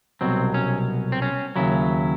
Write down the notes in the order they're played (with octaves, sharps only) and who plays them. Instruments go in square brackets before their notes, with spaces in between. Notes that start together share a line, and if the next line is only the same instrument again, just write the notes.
[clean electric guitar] C2 B2 F#3 C4
C#4
C4
C#4
D#2 C#3 F#3 E4